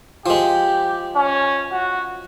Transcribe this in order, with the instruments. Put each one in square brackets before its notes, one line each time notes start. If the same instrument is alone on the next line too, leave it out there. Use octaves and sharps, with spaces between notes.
[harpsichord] F3 G#3 [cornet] G4
[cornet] C#4
F#4